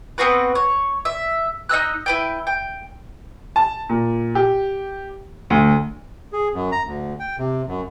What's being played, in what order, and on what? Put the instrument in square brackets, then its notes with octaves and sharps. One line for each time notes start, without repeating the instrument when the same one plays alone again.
[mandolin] B3 C4 F#4 B4
C#5
E5
D#4 D#5 E6 F#6
E4 B4 G5
G5
[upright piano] A5
A#2
G4
D2
[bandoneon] G#4
F#2
A#5
D2
G5
C3
F#2